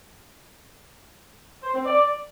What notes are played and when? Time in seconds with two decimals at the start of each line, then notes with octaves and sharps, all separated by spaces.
1.63 C5
1.74 C4
1.86 D5